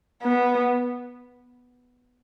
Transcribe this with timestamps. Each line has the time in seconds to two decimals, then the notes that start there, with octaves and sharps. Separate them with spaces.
0.23 B3